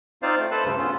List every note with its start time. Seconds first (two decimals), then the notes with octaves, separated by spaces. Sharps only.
0.22 C4 D#4 F4 C5 D5 F5
0.38 A3
0.51 A4 B4 C5 A5 F#6
0.64 D2 G2 C#3 E6
0.78 B3 C#4 F4